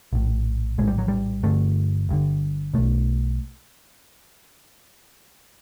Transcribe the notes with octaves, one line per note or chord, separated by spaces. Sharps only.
A#1 A2
A#1 A2 G#3
G3
F#3
G3
G1 G2 D3 A3
G1 G2 D3
B1 B2 A3